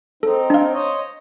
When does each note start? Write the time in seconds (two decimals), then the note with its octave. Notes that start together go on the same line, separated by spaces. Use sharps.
0.23 C4 D#4 A4
0.50 D4 F5
0.73 C5 C#5 D#5